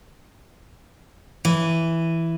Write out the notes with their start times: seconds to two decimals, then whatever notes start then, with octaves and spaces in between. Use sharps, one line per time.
1.45 E3